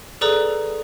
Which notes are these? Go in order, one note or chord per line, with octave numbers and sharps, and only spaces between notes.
G#4 A4 B4 D5 A#5 D#6